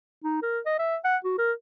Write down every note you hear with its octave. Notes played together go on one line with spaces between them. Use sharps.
D#4
A#4
D#5
E5
F#5
F#4
A#4